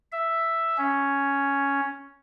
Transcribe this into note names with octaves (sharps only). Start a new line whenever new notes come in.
E5
C#4